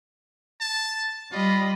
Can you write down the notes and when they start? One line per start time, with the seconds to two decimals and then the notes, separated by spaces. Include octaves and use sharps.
0.61 A5
1.32 G3 F4 D#5 B5